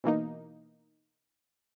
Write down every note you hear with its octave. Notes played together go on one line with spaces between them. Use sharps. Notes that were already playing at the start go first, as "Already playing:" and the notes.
B2 E3 A#3 D#4